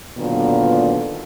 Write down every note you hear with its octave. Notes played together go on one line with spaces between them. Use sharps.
A#2 D3 D#3 F#3 B3 F4